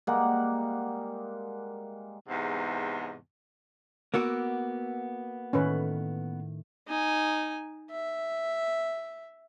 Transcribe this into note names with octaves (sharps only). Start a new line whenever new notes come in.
G3 G#3 A#3 F#5
E2 G#2 C3
A#3 B3 F#4 D6 E6
A2 D#3 C#4 B4
D#4 G#5
E5